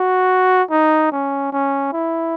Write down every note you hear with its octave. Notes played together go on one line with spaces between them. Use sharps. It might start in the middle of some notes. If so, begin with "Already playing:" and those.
Already playing: F#4
D#4
C#4
C#4
E4